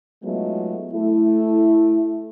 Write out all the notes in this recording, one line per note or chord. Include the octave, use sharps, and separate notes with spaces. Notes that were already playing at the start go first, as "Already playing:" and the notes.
F#3 G#3 A3 B3 D#4 F4
A3 E4